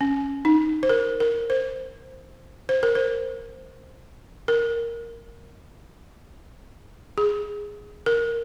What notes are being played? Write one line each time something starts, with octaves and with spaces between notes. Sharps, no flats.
C#4
D#4
C5
A#4
A#4
C5
C5
A#4
C5
A#4
G#4
A#4